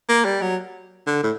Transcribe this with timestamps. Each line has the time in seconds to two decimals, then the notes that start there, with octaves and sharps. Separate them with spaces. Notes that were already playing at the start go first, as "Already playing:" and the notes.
0.09 A#3
0.25 G3
0.42 F#3
1.07 D3
1.24 A2